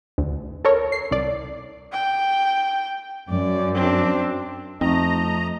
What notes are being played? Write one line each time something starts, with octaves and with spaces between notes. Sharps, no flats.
D2
A4 A#4 C#5
C7
C2 D5
G5
F#2 D5
C4 D4
F2 A3 C4 D#4 D#5 A#5